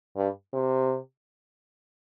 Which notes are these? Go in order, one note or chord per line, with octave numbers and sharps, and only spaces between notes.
G2
C3